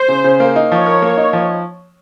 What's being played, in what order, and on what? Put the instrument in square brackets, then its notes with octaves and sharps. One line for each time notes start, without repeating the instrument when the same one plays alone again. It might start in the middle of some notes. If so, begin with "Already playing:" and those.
Already playing: [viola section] C5
[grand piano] C#3
C#3
A#3
D#4
[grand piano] F3 [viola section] C#5
[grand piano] A#4
A#3
D#4
F3